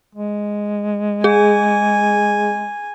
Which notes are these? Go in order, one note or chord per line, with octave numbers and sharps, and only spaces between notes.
G#3
G#4 G#5